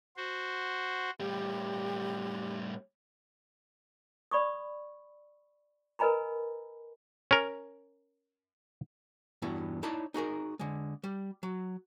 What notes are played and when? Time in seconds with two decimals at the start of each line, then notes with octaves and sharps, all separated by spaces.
0.17 F#4 C5
1.20 A2 G3 G4
4.31 D5 B5 C#6 D#6
5.99 A#4 B4 D#5 G#5 A#5 B5
7.31 C#4 A#4
9.42 E2 G2 B2 B3 E4
9.83 D#4 E4 C#5 D5 A5
10.14 D#4 F#4 G#4 A#4
10.59 D3 G#3
11.04 G3
11.43 F#3